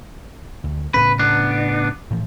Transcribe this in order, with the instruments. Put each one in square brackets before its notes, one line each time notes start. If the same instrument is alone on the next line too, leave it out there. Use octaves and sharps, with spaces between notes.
[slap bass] D2
[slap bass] A2 C#3 C#4 [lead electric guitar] B4
[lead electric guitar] B3 D4
[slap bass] A2 E3 F3